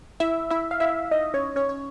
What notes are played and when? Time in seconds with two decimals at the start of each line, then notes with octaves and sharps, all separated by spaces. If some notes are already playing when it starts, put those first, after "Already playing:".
0.20 E4 E5
0.50 E4 E5
0.71 F5
0.80 E4 E5
1.11 D#4 D#5
1.34 C#4 C#5
1.56 C#4 C#5
1.69 C#5